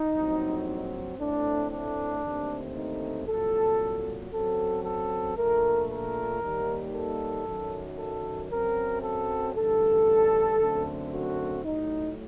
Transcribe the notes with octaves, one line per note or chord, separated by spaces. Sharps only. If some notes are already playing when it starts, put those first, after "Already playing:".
Already playing: D#4
A#1 A2 F#3 C4
A2 A3 C4 D4
D4
D#2 D3 A3 C4
D#4
C2 A#2 F#3 A4
F#2 F#3 C4 A4
A4
A#1 A#2 A3 A#4
A#4
D#2 D#3 G3 A#3
A4
F#2 D#3 F#3
A4
F#2 F#3 C4 A#4
A4
A1 G2 D3 A4
F#2 D3 A3 C4
F#4
A2 F#3 A3 D#4